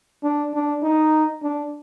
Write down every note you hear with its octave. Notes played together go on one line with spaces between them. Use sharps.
D4
D4
D#4
D4